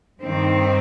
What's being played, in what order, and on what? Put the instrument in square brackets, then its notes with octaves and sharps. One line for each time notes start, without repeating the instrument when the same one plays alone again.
[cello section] G2 D#3 C4